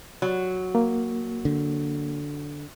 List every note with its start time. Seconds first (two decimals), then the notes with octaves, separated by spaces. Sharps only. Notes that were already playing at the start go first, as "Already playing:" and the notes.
0.22 F#3
0.75 A#3
1.45 D3